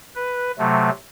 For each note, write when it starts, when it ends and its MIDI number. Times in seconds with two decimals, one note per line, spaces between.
0.15 0.51 71
0.59 0.90 48
0.59 0.90 54
0.59 0.90 57